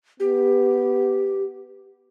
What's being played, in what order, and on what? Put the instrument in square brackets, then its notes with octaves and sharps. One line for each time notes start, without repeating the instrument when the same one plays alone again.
[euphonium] B3 [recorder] G4